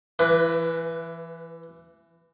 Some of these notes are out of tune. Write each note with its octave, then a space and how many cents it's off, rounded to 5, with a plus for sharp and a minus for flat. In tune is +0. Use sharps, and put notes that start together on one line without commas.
E3 +20 B4 -10